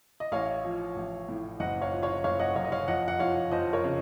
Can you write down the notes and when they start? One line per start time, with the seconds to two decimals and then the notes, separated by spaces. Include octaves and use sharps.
0.20 D#5
0.32 A1 C#5 F5
0.65 F3
0.96 A1
1.29 A2
1.60 F#1 D#5 F#5
1.81 C#5 F5
1.92 F3
2.03 C#5 F5
2.24 F#1 C#5 F5
2.39 D#5 F#5
2.56 F#2 C#5 F5
2.65 D#5
2.72 C#5 F5
2.88 F2 D#5 F#5
3.08 F#5
3.19 F3 C#5 F5
3.51 F2 C5 D#5
3.73 A#4 C#5
3.84 C#3